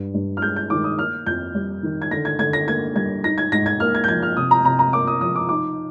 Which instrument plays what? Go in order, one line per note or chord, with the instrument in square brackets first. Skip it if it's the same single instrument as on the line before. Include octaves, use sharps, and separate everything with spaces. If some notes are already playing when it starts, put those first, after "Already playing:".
Already playing: [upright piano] G2
G2
F6
G#3 G6
G6
D#3 D6
D#6
A#3 F6
F2 G6
G3
D#3
G#6
D3 A#6
G#6
D3 G#6
A#6
A#3 G#6
G3 G#6
D#4 A#6
G#6
G#2 A#6
G#6
A#3 F6
G#6
G6
F3 G#6
F6
C3 D#6
A#5
C3 A#5
A#5
A#3 D6
D#6
F3 D#6
D6
D#4 D6